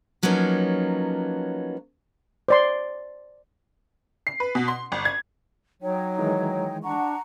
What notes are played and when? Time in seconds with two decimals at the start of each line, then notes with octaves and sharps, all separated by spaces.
0.23 F3 F#3 A#3 B3 C#4 D#4
2.48 C5 D5 C6
4.27 C7
4.40 B4
4.55 B2
4.68 C6
4.92 G1
5.05 G#6
5.82 F#3 D#4 C#5 G5
6.18 D#3 E3 G#3
6.83 D4 F#5 A#5 C#6